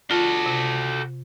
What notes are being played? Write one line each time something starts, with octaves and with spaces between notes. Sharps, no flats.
F4 F#4 A4
C3